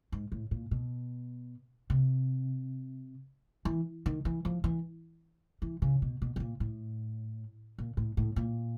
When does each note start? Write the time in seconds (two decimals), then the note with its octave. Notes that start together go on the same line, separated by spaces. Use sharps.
0.12 G#2
0.32 A2
0.51 A#2
0.71 B2
1.90 C3
3.65 E3
4.06 D#3
4.25 E3
4.45 F3
4.64 E3
5.62 E3
5.82 C#3
6.02 B2
6.22 B2
6.36 B2
6.40 A#2
6.60 A2
7.78 A#2
7.97 A2
8.17 A2
8.36 A#2